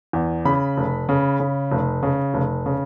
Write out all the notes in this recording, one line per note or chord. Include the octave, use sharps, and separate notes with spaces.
E2
C#3 B5
F1
C#3
C#3
F1
C#3
F1
C#3